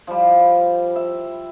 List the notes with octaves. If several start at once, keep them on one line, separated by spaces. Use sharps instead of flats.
F3 G3
E5